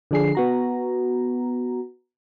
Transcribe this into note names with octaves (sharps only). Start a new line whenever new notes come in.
D3 F3 D4 G#4 C7
B3 F#4 A#5